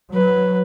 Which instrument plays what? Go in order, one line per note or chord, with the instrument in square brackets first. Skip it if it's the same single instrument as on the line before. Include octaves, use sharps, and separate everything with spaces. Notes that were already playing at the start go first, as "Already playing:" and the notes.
[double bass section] F#3 [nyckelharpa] B4